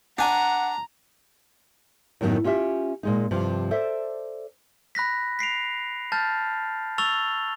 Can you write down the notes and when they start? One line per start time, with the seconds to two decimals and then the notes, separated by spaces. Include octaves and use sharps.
0.19 D4 F#5 G#5 A#5
2.21 F#2 A2 D#3 F#3 B3 D#4
2.44 C#4 F4 G4 E5
3.03 A#2 G#3 D#4
3.31 G2 C3 F3
3.71 A4 C5 D5 E5
4.95 B5 F#6 A#6 B6
5.39 B6 C7 D7 F7
6.12 A5 F6 G6 A6
6.98 C#6 E6 A6 F7 G7